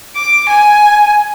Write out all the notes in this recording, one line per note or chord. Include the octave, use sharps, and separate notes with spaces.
D6
G#5